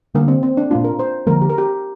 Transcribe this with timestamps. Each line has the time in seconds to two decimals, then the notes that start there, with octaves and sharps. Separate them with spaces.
0.15 D3 G3 A#3 D4
0.28 C4
0.43 C4
0.57 D4
0.71 A#2 A#3 D4 F4
0.84 A#4
0.99 C5
1.27 D3 F3 A#3 A#4
1.42 G4
1.50 A#4
1.58 G4